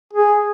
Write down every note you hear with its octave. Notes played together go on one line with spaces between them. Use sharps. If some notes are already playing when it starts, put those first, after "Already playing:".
G#4